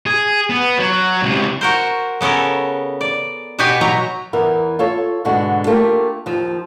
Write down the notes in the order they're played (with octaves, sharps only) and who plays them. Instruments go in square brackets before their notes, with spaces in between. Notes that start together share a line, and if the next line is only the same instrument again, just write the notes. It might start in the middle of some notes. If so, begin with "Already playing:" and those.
[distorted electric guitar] G#4
B3
F#3
C#2 C3
[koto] F#4 A#4 C5
C#3 B3 C#4 A4 A#4
D5
B2 B3 F#4 G4 B4 G#5
B2 F#3 F#4 A#5
[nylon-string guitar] E2 E3 B3 A#4
F4 A4 C#5
G#2 B2 D3 G#3 F#4
A3 A#3 F4 G4 A#4
D#2 F3